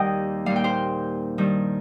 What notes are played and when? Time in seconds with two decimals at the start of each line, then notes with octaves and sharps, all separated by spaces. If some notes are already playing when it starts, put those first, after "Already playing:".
Already playing: D#2 D#3 G3 D#5 G5
0.46 A#2 G3 F5
0.56 G5
0.64 C5 F5
1.38 G2 D#3 G3